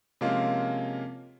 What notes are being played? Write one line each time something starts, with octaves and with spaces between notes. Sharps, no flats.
C3 F3 G#3 A#3 C#4 F4